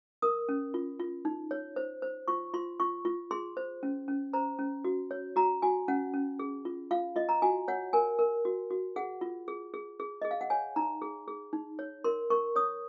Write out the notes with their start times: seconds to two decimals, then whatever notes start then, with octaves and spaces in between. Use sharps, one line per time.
0.22 A#4 D#6
0.49 C#4
0.74 F4
1.00 F4
1.25 D#4
1.51 C#5
1.76 C5
2.02 C5
2.28 F4 C#6
2.54 F4 C6
2.80 F4 C#6
3.05 F4
3.31 G#4 C6
3.57 C5
3.83 C#4
4.08 C#4
4.33 C5 A#5
4.59 C#4
4.85 F#4
5.11 C#5
5.36 F#4 A#5
5.62 F#4 G#5
5.88 C#4 F#5
6.14 C#4
6.39 G#4
6.65 F4
6.91 F4 F5
7.16 F4 D#5
7.29 A#5
7.42 F#4 G#5
7.68 C#5 F#5
7.93 A#4 G#5
8.19 A#4
8.45 F#4
8.70 F#4
8.96 G#4 F#5
9.21 F4
9.48 G#4
9.74 G#4
10.00 G#4
10.22 G#4 D#5
10.31 F5
10.41 F#5
10.50 C#5 G#5
10.76 D#4 A#5
11.02 G#4
11.28 G#4
11.53 D#4
11.79 C#5
12.04 A#4 C6
12.30 A#4 C#6
12.56 C#5 D#6